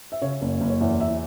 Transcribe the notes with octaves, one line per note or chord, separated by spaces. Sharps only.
E5
C#3 C#5
F#1
F#1
C#5
E2 E5
E3 E5